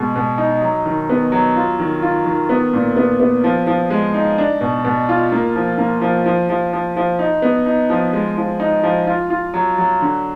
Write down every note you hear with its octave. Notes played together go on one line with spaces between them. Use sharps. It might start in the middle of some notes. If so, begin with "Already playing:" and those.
Already playing: B2 G#3
B2
D#4
F#3
D#3
B3
F#3
F4
D#3
F4
D#3
B3
A#2
B3
B3
F3
F3
G#3
D#4
D4
B2
B2
F4
A#3
F3
A#3
F3
F3
F3
F3
F3
D#4
B3
D#4
F3
G#3
F3
D#4
F3
F4
F4
F#3
F#3
D3